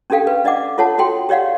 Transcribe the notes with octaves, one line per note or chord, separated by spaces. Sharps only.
C#4 D4 G4 A4 F5 G5
B4
D4 D5 D#5 F#5 D6
F4 A4 C#5 F#5 A5
F#4 A4 G5 C6
G4 C#5 D5 F5 F#5